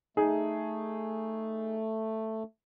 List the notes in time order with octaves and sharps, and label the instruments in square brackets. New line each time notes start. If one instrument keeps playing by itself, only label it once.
[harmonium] A3 [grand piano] D#4 G#4